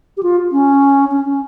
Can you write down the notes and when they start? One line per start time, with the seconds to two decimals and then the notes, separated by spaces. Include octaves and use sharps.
0.17 G4
0.23 F4
0.52 C#4
1.11 C#4
1.26 C#4